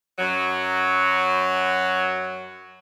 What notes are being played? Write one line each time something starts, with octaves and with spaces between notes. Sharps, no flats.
F#2 F#3